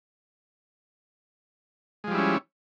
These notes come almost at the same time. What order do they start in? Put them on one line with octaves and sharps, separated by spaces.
G#3 F3 G3 E4 C#4